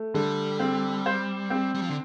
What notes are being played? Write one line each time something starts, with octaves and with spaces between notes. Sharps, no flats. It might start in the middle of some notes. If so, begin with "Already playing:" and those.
Already playing: A3
D3 G3
C4
C5
C4
G3
F3
D3